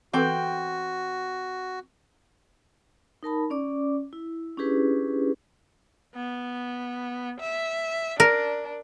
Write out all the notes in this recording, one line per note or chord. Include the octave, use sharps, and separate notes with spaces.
E3 C4 F#4 A4 B4 G5
D#4 A#4 A5 B5
C#4 D5 D6
E4
C#4 D4 E4 G4 G#4 B4
B3
E5
D4 A#4